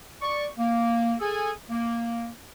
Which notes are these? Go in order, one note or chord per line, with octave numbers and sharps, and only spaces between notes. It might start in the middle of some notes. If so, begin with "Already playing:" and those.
D5 C#6
A#3
G#4 A4 G#5
A#3